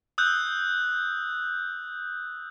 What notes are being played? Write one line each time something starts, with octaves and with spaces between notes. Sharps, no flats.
D#6 E6 F#6 G6